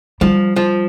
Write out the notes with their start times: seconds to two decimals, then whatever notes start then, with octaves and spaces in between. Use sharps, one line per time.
0.21 F3 G3
0.56 F3